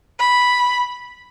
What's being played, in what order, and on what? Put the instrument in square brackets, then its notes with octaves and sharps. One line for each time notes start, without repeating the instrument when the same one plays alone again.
[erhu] B5